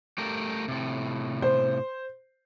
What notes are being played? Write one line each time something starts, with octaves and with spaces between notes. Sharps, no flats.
A3 G4 A#4
A2 C3
C5